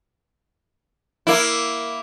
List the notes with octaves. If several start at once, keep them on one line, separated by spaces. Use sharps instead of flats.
A#3 E4